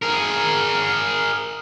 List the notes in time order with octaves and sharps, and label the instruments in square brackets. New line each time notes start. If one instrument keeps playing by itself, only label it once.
[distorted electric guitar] G#4 A#4